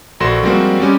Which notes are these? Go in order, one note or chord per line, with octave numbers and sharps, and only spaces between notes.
A#1 F#4 A4 C6 A#6 E7
F3 G3 G#3 A#3 C4 F#4
G3 G#3 C#4 G4